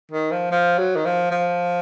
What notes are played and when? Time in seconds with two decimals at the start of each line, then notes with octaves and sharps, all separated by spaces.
0.11 D#3
0.31 F3
0.51 F3
0.78 F#3
0.96 D#3
1.05 F3
1.31 F3